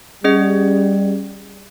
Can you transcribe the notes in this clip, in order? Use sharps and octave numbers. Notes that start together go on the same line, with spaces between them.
G3 C#4 G#4 D#5